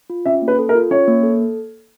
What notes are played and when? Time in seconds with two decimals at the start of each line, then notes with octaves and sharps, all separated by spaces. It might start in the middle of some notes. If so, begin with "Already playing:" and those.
0.10 F4
0.26 C#4 E5
0.42 A#3
0.48 B4
0.59 A4
0.69 A#4
0.75 F4
0.91 C#4 C#5
1.08 A#3
1.23 A4